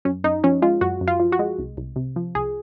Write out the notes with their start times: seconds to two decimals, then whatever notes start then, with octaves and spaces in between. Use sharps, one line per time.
0.05 F#2 C#4
0.24 F#2 D#4
0.44 F3 C#4
0.62 G#3 F4
0.81 F#2 F#4
1.01 F#2
1.08 F4
1.20 F3
1.32 F#4
1.39 G#3
1.59 C2
1.77 C2
1.96 C3
2.16 F3
2.35 C2 G#4